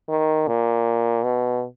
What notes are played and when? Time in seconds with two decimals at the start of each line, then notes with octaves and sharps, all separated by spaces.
0.09 D#3
0.48 A#2
1.24 B2